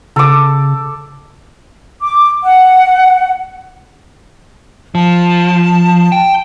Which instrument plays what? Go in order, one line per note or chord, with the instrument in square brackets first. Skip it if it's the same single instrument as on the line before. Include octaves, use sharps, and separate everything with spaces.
[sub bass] C#3 [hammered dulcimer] A4 D6
[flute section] D6
F#5
[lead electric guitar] F3 [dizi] A5
[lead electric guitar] G5